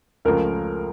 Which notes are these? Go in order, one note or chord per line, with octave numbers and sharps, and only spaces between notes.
C#2 C#3 F3 A3 A#4